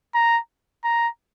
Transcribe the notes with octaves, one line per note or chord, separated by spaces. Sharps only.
A#5
A#5